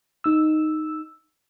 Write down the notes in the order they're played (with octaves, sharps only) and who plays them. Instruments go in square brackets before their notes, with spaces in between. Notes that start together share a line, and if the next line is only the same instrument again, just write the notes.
[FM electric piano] D#4 E6